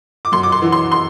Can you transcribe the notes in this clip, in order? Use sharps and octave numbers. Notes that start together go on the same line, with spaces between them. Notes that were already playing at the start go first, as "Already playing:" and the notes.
D6
F#2 C6
D6
C6
E3
C6
C6